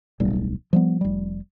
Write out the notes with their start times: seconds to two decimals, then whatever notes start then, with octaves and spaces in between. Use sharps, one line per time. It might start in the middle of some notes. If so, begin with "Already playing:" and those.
0.20 D1 B1 G3
0.73 F3 G3 B3
1.01 F1 G3